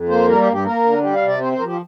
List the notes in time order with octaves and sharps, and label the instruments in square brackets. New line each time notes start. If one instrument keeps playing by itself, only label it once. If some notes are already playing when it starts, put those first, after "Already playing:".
Already playing: [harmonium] F2
A#3 C5
G3 A#4
G4
G2
G4
A#3 A#4
D3
G3 G4
F5
C3
D5
C4 C5
C5
F3 A#4
G4
F4